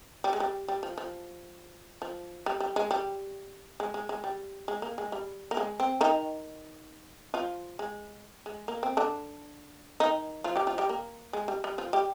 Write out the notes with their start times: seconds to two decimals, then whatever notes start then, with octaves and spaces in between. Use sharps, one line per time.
0.24 G3
0.33 G#3
0.40 G3
0.68 G3
0.83 F3
0.98 F3
2.02 F3
2.46 G3
2.60 G3
2.76 G#3
2.91 G3
3.80 G#3
3.94 G#3
4.09 G#3
4.24 G3
4.68 G#3
4.82 A#3
4.98 G#3
5.12 G3
5.51 A#3
5.57 G#3
5.80 C4
6.01 D#3 D#4
7.34 F3 F4
7.79 G#3
8.46 G#3
8.68 A#3
8.83 C4
8.97 D3 D4
10.00 D#3 D#4
10.44 F3 F4
10.56 G3 G4
10.67 F3 F4
10.78 G3 G4
10.89 A#3
11.33 G#3
11.48 G3
11.64 G3
11.78 F3 F4
11.93 G3 G4